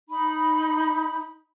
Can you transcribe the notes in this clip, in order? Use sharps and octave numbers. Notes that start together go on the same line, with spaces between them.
D#4 B5